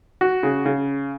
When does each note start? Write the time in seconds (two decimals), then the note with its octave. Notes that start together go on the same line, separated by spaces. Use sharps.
0.21 F#4
0.43 C#3
0.66 C#3